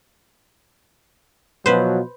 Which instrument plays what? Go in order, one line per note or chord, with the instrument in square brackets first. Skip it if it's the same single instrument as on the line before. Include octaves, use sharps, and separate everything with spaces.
[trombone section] B2 F3 F#3 [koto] B4 C5